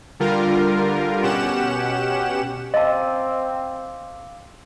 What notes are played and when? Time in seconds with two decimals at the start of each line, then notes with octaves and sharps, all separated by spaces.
0.20 D3 G3 F4 A#4
1.23 B2 C#4 G4 F#5 E7
2.74 C4 D#5 F5 A5 D6 E6